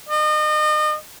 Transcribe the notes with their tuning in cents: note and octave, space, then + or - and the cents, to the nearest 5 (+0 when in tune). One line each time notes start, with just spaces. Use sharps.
D#5 -35